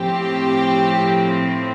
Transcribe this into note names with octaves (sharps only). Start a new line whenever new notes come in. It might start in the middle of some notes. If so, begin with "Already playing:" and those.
Already playing: A2 F3 C4 G4